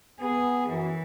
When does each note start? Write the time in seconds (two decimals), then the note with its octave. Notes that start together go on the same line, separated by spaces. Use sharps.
0.21 B3 G#4
0.69 F#2 E3